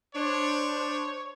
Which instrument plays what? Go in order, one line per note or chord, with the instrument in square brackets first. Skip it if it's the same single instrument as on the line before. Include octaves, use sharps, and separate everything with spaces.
[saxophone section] D4 [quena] C5 [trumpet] C#5